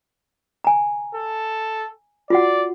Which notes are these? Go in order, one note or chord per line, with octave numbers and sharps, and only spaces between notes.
G#5 A#5
A4
F4 F#4 D5 F#5